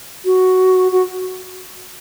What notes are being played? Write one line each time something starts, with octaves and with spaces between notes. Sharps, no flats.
F#4
F#4